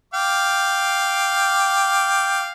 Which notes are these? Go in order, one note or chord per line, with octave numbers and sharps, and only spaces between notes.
F5 G5 D6